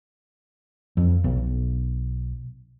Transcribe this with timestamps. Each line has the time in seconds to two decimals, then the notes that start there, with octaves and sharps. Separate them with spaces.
0.97 F2
1.24 B1